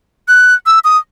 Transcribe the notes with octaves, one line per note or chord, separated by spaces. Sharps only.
F#6
E6
D#6